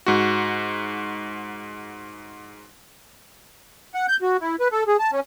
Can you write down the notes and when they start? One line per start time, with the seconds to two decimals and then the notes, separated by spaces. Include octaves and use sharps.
0.06 G#2 F#4
3.94 F#5
4.08 G6
4.22 F#4
4.41 E4
4.60 B4
4.72 A4
4.87 G#4
4.99 A5
5.12 C#4